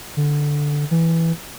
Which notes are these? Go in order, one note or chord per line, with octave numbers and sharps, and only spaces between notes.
D3
E3